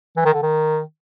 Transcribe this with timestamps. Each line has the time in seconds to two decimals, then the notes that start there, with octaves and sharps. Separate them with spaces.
0.17 E3
0.25 D#3
0.34 D3
0.42 D#3